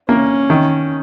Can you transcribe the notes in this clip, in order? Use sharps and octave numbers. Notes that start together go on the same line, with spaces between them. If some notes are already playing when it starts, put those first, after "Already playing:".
A#3 C#4
D#3